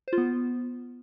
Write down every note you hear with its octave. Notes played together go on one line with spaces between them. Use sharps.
C5
F4
B3